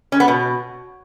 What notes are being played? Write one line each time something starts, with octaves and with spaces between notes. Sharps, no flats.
C#4
B3
B2